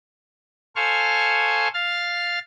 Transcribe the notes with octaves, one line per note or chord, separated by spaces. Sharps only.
A4 C5 F5 G#5 C#6 F6
F5 F6 A6